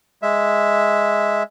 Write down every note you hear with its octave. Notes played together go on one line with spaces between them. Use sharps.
G#3 E5